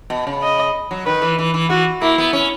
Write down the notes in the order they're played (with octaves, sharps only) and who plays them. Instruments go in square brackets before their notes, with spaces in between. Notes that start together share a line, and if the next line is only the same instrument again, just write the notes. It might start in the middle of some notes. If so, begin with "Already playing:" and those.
[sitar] B2
C#3
[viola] D#5
[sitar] F#3
[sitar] D#3 [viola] B4
[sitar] E3
E3
E3
[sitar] E3 [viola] F#4
[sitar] A#3 [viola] E4
[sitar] B3
C#4